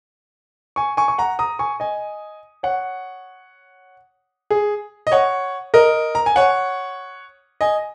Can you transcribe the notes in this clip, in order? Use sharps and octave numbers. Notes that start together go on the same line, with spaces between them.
G#5 C#6
G#5 C#6
C#6
F#5 A#5
A#5 D#6
G#5 C#6
D#5 G#5
C#5 F#5
G#4
D#5
C#5 F#5
A#4 D#5
A#5
G#5
C#5 F#5
D#5 G#5